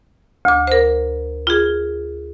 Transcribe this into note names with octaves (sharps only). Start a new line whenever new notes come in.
D2 D6
A#4 C5
F4 G#4